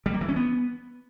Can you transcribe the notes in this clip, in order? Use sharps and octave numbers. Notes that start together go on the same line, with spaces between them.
G3
A#3
E3
C#4
B3